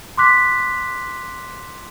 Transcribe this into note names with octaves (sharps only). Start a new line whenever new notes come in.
C6 D6 F#6 B6